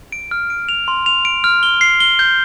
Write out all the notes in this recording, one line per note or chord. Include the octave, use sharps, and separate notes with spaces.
D7
F6
D7
F7
C6
F7
D7
F6
G7
C7
G7
G6